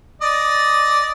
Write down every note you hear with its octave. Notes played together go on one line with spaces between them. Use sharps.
D5 D#5